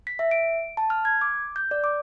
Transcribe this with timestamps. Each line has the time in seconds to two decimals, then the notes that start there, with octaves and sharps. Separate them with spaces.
0.07 B6
0.19 E5
0.31 D7
0.77 A5
0.90 F6
1.05 G#6
1.21 D6
1.56 G6
1.71 D5
1.84 D6